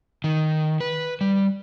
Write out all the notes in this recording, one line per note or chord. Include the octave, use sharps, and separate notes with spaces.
D#3
B4
G3